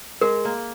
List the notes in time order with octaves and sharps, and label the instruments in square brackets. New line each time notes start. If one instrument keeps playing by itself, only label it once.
[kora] G#3 [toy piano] A#4
[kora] A#3